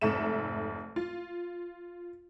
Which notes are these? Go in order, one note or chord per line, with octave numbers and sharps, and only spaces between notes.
F1 G#2 A4 E5 E7
F4